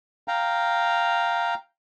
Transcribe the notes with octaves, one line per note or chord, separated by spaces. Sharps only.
F5 G5 A#5